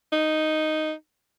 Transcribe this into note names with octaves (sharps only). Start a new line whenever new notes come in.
D#4